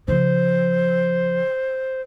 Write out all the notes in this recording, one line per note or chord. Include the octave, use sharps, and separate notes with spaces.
C#3 F3 C5